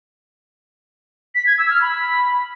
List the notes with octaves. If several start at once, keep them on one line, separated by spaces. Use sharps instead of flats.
B6
G#6
E6
F6
B5